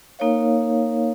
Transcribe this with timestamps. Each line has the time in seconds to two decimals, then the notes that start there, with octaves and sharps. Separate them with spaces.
0.19 A#3 D#4 A#4 C#5 F5